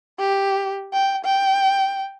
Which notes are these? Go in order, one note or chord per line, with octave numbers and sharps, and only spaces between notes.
G4
G5
G5